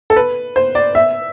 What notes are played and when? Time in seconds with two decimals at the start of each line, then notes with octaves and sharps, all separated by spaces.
0.10 A4
0.16 B4
0.56 C5
0.75 D5
0.95 E5